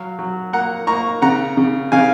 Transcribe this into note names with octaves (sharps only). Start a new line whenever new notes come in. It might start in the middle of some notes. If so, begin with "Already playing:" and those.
Already playing: F#3 F5
F#3
A#3 F#5 A#5
A#3 A#5 C#6
C#3 F#5 A#5
C#3
C#3 F5 G#5